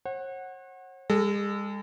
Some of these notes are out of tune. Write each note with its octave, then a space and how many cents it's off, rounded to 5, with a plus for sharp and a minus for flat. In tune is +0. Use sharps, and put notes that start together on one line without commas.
C#5 -45 F#5 +0
G#3 -40 A4 +0